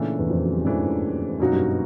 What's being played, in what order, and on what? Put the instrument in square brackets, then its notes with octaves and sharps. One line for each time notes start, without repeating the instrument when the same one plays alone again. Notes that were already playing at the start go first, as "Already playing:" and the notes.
Already playing: [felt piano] A#2 [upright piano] C#3 E3 A3 D4
[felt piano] E2
F2
F#2
G2
[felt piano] G#2 [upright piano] C#3 E3 A3 D4
[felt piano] F#2 [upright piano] B2 F#3 A#3 D#4 F#4
[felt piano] G2